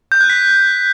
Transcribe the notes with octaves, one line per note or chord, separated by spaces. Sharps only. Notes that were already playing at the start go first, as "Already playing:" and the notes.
G6
F#6
B6